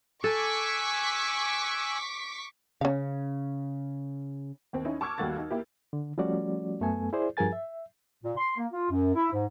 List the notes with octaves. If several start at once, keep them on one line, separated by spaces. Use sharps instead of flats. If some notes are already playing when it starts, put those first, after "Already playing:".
A4 G#5 C#6 D6 E6 F#6 B6
C#3 C#4 F5
D#2 C4
C#4 D#4 E4
A5 C#6 D6 E6 F6 G#6
D#2 G3 A3 F#4 F5 A6
D#4
A#3 E4 G4
D3
F3 G3 A3 C#4 F#4 D5
F#2 A3 B3 A4 G#5
E4 G#4 C5 D5
G2 F3 G#4 A#4 G#5 A6
E5
A#2
C6
A#3
F4
F#2
E4
G#2